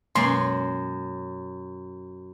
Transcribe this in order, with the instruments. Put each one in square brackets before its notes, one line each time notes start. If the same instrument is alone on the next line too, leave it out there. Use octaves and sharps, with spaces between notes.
[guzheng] F#2 [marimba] B2 G#3 A#3 [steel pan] C6